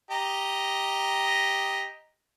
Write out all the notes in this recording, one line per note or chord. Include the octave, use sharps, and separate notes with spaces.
G4 D#5 A#5